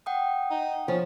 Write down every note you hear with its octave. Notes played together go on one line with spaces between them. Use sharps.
F#5 G5 D#6
D#4
F3 C#4